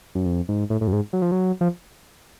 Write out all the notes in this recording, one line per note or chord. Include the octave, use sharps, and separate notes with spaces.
F#2
F2
G#2
A2
A2
F#2
G#2
F#3
F3
F#3
F3